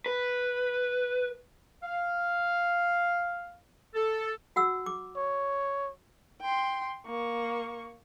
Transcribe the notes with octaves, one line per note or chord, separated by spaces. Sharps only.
B4
F5
A4
F#4 F#5 E6
D6
C#5
G5 C6
A#3 C#6